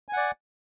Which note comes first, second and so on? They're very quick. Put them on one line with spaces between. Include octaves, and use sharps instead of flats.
G#5 F#5 D5